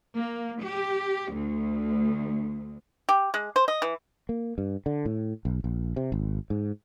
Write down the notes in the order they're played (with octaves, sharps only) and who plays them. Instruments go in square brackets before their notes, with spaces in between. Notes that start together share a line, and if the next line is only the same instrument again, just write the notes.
[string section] A#3
G4
D2
[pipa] G4
G#3
C5
D#5
E3
[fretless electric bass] A#3
G2
D3
A2
B1
A#1
C3
G#1
G#2